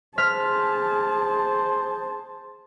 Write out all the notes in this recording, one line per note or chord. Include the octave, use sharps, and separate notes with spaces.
G#4 C5 A5 F6 B6